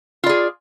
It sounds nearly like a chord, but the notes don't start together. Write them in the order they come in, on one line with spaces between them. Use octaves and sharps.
F4 D5 G#4